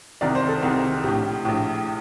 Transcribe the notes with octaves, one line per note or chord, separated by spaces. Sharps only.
C2 C3 D#3 D5
C5
A4
C2 C3 D#3
A#1 A2 G4
A#1 A2